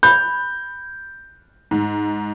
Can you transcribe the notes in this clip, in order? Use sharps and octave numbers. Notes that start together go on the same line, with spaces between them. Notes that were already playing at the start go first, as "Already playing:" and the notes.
B5 G6
G#2